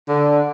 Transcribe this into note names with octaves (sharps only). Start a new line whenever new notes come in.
D3